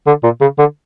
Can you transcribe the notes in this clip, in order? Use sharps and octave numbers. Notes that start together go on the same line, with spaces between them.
D3
A#2
C#3
D3